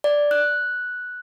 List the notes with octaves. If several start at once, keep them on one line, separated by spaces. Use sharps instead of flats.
D5
F#6